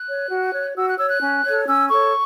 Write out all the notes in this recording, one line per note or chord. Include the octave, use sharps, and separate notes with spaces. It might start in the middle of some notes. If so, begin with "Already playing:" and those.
Already playing: F#6
C#5
F#4
C#5
F#4 E6
F#6
C#5 E6
F#6
C#4
A4 C#5
C#4 E6
A4 C#5 C#6